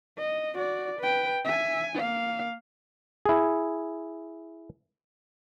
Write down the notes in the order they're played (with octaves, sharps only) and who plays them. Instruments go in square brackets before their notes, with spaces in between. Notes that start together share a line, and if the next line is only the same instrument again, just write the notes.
[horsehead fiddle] D#5
F#4 D5
B4 G5
E5 G#5
A#3 F5
[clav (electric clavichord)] E4 G#4